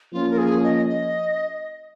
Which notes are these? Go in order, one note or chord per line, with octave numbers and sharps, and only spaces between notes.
F3 A#3 C#4 F4
A#4
G#4
D#5
D#5